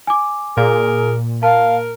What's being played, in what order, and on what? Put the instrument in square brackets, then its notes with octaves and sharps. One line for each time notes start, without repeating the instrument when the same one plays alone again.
[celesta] G#5 D6
[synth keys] A#2 [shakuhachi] G#4 [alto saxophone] A#4
[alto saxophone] A#4 [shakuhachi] F5 [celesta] A5